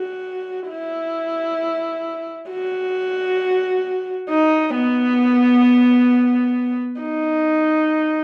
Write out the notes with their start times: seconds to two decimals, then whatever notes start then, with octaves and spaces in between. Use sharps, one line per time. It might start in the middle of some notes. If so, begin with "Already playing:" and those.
Already playing: F#4
0.69 E4
2.50 F#4
4.30 D#4
4.75 B3
7.01 D#4